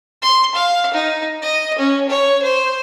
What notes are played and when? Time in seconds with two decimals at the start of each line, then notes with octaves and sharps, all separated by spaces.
0.22 C6
0.55 F5
0.93 D#4
1.42 D#5
1.78 C#4
2.09 C#5
2.42 C5